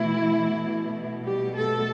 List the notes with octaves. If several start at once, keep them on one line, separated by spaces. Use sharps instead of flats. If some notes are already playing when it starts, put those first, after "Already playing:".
Already playing: B2 E3 A3 E4
G3 G4
A3 A4